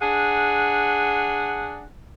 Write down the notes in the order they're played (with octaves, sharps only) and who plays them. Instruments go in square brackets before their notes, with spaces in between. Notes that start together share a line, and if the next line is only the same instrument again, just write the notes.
[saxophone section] D4 G#4 F#5